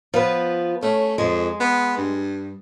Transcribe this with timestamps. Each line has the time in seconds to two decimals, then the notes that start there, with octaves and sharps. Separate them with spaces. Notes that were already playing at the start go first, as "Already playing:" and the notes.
0.14 F3 B3 B4
0.83 A3 C#4
1.18 F2 G#3
1.60 B3
1.97 G2